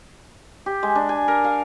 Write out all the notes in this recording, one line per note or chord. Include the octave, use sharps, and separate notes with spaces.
G4
G#3
D4
G#5
A#4
F5